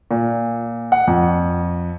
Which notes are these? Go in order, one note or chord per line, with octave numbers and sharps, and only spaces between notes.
A#2
F#5
F2